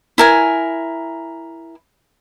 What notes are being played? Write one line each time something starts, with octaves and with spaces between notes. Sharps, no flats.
E4 A#4 G#5